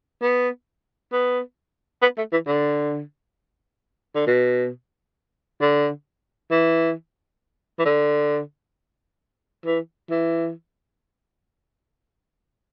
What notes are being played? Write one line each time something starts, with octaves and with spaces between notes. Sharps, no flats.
B3
B3
B3
A3
E3
D3
D3
B2
D3
E3
E3
D3
E3
E3